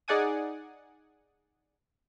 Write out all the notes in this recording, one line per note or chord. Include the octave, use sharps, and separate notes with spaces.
D#4 G#4 D5 F#5 G#5 D#6